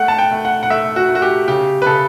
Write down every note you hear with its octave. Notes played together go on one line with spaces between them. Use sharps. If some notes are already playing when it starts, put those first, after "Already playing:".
Already playing: A3 F#5
A5
G5
A3
F#5
F#5
A3 E5
F#4
A3
F#4
G4
C#3 G4
B4
C#3 A4